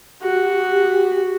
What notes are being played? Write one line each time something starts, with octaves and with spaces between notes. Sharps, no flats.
F#4 G4